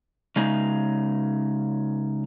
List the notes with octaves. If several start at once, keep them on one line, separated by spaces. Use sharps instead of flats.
C#3 G#3 D#4